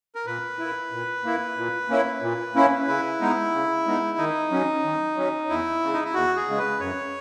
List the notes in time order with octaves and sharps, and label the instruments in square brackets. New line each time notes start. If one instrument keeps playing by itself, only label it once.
[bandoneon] A#4
[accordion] A#2 [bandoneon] B4
[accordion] A#3 E4
A#2
A#3 E4
A#2
A#3 C#4 E4
A#2
A#3 C#4 E4
[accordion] C#3 [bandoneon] E4
[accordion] G#3 B3 D#4
C#3
G#3 B3 D#4
[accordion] D#3 [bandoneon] D#4
[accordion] F#3 C#4
D#3
F#3 C#4
[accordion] E2 [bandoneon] E4
[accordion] C#3 G#3
[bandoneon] D#4
E4
[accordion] E2 [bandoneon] F#4
[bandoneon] G#4
[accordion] C#3 G#3
[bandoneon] B4
[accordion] F#2 [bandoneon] C#5